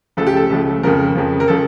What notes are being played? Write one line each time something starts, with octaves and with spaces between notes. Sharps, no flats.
C#2 C#3 F3 A3 A4
G4
A4
C#2 C#3 F3 A3
F2 C#3 F3 A#4
F2 C#3 F3
A#4
C#3 F3 A4